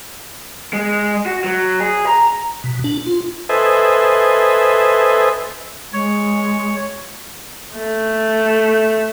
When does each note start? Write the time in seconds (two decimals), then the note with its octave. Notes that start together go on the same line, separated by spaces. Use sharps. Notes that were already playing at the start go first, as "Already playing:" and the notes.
0.73 G#3
1.26 F#4
1.44 F#3
1.80 G#4
2.07 A#5
2.64 B2
2.84 D4
3.06 F4
3.49 A4 B4 C5 D#5 E5 G#5
5.93 G#3 C#5
7.77 A3